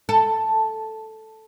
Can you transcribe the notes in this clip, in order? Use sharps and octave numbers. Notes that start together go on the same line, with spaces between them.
A4